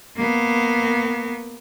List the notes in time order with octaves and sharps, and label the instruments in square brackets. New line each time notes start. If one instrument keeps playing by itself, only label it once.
[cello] A#3 B3